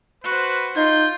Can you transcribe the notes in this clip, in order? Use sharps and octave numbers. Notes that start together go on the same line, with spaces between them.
F#4 B4 C5
D#4 F4 G6